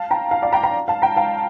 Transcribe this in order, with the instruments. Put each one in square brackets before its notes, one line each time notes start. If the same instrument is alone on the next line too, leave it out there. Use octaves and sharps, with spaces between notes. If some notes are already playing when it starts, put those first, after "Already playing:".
Already playing: [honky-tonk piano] F5 A5
G5 A#5
F5 A5
D5 F5
G5 A#5
G5 A#5
F5 A5
G5 A#5
F5 A5